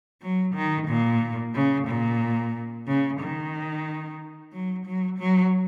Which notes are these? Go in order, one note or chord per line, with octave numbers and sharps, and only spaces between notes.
F#3
D#3
A#2
C#3
A#2
C#3
D#3
F#3
F#3
F#3